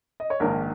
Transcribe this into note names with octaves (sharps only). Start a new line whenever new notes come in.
D#5
C#5
A#1 G#2 D#3 A#4